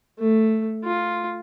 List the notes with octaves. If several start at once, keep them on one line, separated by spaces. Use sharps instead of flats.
A3
F4